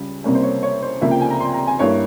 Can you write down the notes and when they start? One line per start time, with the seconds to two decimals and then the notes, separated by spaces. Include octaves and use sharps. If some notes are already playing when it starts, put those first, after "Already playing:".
Already playing: C#2 C#3 G3
0.24 C2 C3 G3 A#3 C#4
0.35 C5
0.43 C#5
0.63 C#5
0.82 C5
1.01 C#2 C3 F3 A#3 E5
1.11 G5
1.21 G#5
1.30 A#5
1.40 C6
1.54 A#5
1.67 G#5
1.79 G2 G3 A#3 E4 C#5